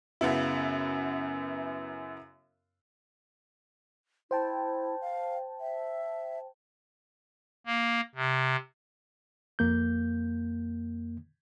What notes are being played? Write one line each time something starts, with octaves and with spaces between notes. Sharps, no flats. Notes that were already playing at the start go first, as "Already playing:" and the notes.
F#2 C#3 B3 E4
E4 C5 G5 A5
F5
E5
A#3
C3
F2 A#3 G6